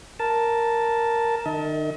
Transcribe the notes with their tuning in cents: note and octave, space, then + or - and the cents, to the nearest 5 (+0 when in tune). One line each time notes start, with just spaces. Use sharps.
A#4 +0 A5 +0
D#3 -35 D#5 +40